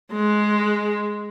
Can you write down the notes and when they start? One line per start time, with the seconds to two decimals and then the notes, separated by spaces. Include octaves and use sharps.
0.12 G#3